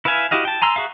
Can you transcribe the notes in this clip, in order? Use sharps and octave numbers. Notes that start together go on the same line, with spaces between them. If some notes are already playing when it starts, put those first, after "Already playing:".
E4 B4 E5 F5 G#5
E4 F#4 G4 D#5 F5
G5 A5
G#5 A#5 C6 E6
F#4 G#4 E5 F5